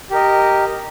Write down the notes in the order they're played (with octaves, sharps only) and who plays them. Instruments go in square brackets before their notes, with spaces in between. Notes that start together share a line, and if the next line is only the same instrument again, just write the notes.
[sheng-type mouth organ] G4 A#4 D#5